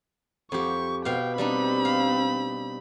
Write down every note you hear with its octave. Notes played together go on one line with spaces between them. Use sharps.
F2 G4 C#6
B2 F5 G5
G3 C4 D4 D#4 B5
F5